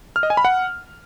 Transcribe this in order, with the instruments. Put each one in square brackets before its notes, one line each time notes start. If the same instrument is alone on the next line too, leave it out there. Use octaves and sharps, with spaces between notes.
[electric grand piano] F6
D#5
G#5
B5
F#5